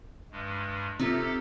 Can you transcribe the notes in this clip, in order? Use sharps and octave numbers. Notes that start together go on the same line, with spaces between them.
G2 G#3
C3 D#4 F4 G4 A4